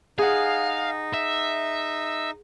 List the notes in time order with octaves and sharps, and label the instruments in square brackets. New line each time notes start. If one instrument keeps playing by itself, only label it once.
[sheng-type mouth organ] D#4 [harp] G#4 F#5 [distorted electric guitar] F5
[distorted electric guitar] E5